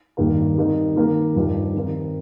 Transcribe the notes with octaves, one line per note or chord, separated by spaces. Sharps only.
G2 D#3 A#3 G4 A#4
D#3 G3 C4 D#4 A#4
D#3 A#3 G4 A#4
G2 F3 D#4 G4 A#4
D#3 C4 D#4 A#4